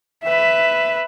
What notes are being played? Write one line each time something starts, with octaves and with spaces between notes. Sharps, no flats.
B4 E5